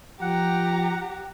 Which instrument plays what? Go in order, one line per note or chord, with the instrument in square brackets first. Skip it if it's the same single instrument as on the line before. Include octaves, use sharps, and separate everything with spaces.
[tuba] F3 [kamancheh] G4 A#5 [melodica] F#5